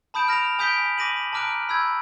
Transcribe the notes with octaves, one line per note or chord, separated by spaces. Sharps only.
A5 B5 D#6 G6 D7 E7
F6 A#6 D7 F7
G#5 D#6 G6 B6 D7 G7
D6 A#6 D#7 F#7
A5 A#5 D6 F6 F#6 D7
B5 E6 G6 G#6